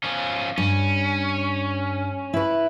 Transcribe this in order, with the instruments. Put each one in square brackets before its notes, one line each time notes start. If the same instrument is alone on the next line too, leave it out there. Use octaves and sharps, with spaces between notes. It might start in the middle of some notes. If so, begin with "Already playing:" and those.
[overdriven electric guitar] F3 C#4
[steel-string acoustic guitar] G2 [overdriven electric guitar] C#4
[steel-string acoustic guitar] E4 B4